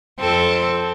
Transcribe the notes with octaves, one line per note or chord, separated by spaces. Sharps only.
F2 C4 A4